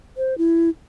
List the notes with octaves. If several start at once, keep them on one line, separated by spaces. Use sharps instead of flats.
C5
E4